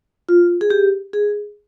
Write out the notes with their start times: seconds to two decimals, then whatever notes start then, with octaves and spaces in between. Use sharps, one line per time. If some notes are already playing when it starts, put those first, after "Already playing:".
0.29 F4
0.61 G#4
0.70 G4
1.13 G#4